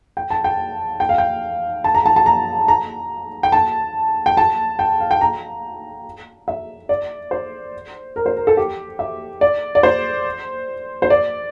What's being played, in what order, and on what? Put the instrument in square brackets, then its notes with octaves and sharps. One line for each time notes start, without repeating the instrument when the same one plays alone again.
[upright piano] G5
A5
G5
G5
F5
G5
A5
A#5
A5
A5
A#5
A#5
G5
A5
G5
A5
G5
F5
G5
A#5
E5
D5
C5
A#4
C5
A#4
A4
G4
E5
D5
D5
C5
C5
D5